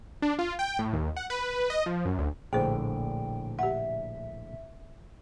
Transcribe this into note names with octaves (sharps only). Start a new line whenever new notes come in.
D4
F4
G5
A2
D#2
F#5
B4
D#5
F3
F#2
D2
A#1 A2 D3 G#4 C5 G5
G4 E5 F#5